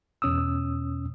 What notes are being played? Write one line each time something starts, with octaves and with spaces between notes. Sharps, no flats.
E2 B2 C#4 D#6 E6